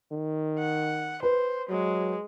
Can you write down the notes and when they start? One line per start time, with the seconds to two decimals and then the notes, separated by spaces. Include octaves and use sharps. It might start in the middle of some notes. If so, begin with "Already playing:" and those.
0.12 D#3
0.59 F#5
1.23 B4 C5
1.69 F#3 G#3